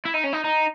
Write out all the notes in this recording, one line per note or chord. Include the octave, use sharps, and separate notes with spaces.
E4
D#4
C#4
D#4
D#4